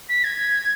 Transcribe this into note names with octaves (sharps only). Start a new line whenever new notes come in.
B6
G#6